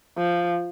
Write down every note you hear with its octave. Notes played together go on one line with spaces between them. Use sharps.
F3